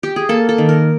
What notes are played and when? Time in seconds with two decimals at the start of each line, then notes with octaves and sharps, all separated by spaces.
0.03 G4
0.16 G#4
0.29 A#3 A4
0.49 A4
0.58 D#3
0.69 A#4